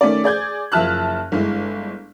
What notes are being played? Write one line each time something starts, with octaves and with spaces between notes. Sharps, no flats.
D#3 A3 C#4 D5
G#4 D5 G6 G#6
F#1 F3 E5 A5 F6 F#6
G1 G#3 E4